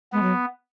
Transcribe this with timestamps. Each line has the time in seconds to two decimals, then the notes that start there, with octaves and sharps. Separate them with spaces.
0.13 G#3 B3
0.23 F#3